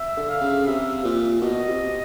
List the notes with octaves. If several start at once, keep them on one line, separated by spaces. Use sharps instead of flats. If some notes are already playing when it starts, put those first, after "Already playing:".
Already playing: E5
D3
F5
C#3
C3 E5
A#2
B2 D#5
C3